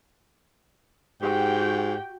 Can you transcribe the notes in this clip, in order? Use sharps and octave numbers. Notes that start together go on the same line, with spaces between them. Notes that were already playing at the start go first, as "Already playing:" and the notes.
G#2 F#4 G4 G5